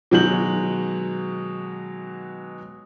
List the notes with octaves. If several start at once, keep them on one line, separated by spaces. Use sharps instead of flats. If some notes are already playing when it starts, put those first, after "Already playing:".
B2 D#3 F#3 G#3 G6 F#7